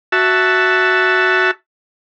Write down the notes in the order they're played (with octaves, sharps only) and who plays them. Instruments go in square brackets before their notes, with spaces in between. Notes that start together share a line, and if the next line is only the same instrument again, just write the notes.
[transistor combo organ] F#4 E5 A5